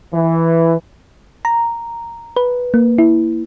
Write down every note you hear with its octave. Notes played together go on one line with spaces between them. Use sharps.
E3
A#5
B4
A#3
E4